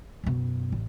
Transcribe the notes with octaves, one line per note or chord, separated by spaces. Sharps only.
F#2 B2
A1